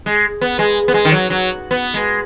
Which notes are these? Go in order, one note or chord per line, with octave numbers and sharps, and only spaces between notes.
G#3
B3
G#3
B3
G#3
D#3
F#3
F#3
B3
G#3